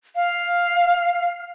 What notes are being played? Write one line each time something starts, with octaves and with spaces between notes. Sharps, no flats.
F5